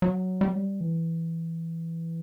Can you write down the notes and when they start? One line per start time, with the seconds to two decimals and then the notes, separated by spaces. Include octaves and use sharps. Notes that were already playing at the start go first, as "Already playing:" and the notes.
0.02 F#3
0.41 G3
0.48 F#3
0.55 G3
0.81 E3